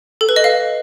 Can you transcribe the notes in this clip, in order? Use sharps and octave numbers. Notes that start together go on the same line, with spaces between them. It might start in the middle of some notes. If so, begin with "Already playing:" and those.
A4
B4
D#5
F5